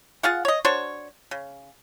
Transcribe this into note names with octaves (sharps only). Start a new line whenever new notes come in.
F4 G#4 F5 F#5
C#5 D#5
D4 F#4 C5 C#5
C#3